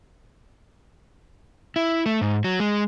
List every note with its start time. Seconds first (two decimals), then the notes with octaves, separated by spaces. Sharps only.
1.76 E4
2.06 A3
2.21 G#2
2.44 F#3
2.60 G#3